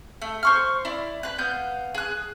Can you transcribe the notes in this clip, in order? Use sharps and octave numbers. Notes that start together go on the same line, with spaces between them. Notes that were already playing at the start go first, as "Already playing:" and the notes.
A3
C5 C#6 F6
E4 D5
B4 F#6
B3 F5 G6
G#4 F#6